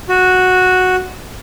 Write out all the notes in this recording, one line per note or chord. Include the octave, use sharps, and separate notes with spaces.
F#4